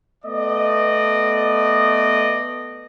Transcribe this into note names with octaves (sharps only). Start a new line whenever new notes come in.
A3 B3 D5 D#5